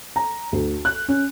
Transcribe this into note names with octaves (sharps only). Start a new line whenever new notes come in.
A#5
D2
F#6
C#4